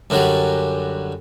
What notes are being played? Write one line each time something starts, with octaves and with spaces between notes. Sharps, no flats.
F#2 D3 F#3 G3